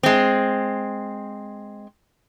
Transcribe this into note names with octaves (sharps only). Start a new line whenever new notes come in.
G#3 C4